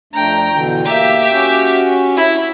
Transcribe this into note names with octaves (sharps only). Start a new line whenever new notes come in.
F2 A3 D4 G5 A#5
B2 D3 E3
A#3 G4 E5 A#5
C#4 F#4
E4